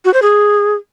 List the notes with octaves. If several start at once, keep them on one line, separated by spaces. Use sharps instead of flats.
F#4
C5
G#4